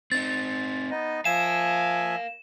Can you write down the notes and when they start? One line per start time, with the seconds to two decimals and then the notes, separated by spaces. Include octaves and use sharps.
0.12 C4 D#4 A6
0.91 B3 D#4 D#5
1.25 F3 A#4 E5 F5 G#5 E7